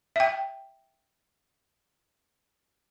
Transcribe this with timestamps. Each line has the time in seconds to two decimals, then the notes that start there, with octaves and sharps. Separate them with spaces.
0.16 E5 G5